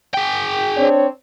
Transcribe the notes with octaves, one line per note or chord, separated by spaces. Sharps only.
G#4 G5
C4 D4 C#5